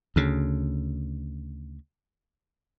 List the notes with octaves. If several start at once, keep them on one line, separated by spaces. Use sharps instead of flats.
D2 C#3